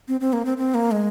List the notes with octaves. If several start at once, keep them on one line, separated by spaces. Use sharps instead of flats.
C4
C4
A#3
C4
C4
A#3
G#3